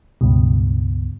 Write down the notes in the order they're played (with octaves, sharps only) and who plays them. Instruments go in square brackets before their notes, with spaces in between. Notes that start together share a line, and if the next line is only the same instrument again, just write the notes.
[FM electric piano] C#2 G2 B2